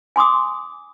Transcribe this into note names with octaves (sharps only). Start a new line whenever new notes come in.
G#5 C6 D6 D#6